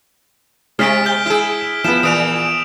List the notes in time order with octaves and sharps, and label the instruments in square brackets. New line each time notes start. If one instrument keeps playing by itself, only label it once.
[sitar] C3 [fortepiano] G#3 [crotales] F6 B6 D7
[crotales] F6 G6 G7
[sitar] E4 G#4
[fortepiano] F3 B3 [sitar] E4 [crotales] E7
[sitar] A#2 E3 [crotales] D#6 D7 F7